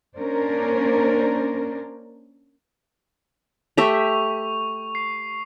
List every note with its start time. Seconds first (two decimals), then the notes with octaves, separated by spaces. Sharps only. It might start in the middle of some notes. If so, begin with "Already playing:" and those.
0.17 A#3 C#4 D4 A#4 C5 D5
3.77 A3 G4 E5 C#6 F7
4.95 C7